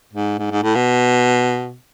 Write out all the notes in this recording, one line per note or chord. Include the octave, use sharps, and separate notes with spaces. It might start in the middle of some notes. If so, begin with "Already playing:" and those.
G#2
G#2
G#2
A2
B2